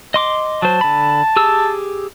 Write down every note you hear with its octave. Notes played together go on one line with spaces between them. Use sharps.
D#5 C6 D6
F#3 C5 A5
D3 B5
G4 G#4 E6